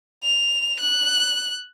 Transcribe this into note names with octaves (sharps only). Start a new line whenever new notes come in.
F7
F#6